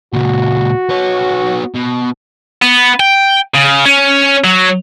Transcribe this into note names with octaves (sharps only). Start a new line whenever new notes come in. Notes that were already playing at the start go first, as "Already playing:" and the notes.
C#2 A#2 F#4
B3 C#5
B2
B3
G5
C#3
C#4
F#3